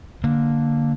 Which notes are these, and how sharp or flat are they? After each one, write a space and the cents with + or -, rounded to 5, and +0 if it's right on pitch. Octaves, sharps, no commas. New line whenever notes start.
D3 +0 A#3 +0